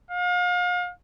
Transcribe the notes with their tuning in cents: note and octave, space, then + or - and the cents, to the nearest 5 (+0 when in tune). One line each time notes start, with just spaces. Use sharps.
F5 +40